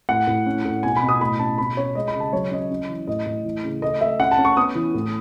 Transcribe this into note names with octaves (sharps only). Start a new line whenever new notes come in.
A2 F#5
A2
C#4
A2
B2 G#5
B5
B2
D#6
A2 B5
C#4 A5
B2 B5
C#4 C#5
G#3 D#5
B5
C#3
A5
F#3 C#5
C#4 D#5
C#4
E3
A2 D#5
A2
E3
C#3
A3 D#5
A3 E5
C#4 F#5
A5
C#4
C#6
B3 D#6
E3
A2